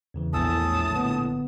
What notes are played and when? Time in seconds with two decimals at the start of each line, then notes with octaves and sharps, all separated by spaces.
0.14 E2 C#3 E3
0.33 A#1 E2 A2 G#5 A5 D#6 E6
0.92 D3 B3